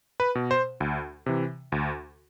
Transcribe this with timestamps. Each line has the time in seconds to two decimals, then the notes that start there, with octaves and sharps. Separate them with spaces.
0.20 B4
0.35 B2
0.51 C5
0.80 D2
1.26 C3 E3
1.72 D2